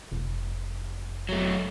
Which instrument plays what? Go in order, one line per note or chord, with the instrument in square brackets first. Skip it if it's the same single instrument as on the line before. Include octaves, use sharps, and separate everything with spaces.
[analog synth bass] F1
[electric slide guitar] F#3 A3